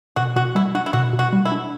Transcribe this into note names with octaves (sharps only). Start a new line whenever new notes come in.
B2 F#4
B2 F#4
G3 E4
D4 F#4
E4
B2 F#4
B2
F#4
G3
E4
D4